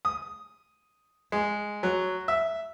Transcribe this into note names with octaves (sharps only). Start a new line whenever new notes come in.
D#6
G#3
F#3
E5